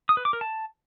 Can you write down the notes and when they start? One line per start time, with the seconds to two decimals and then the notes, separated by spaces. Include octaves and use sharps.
0.09 D#6
0.17 B4
0.25 D6
0.33 A#4
0.41 A5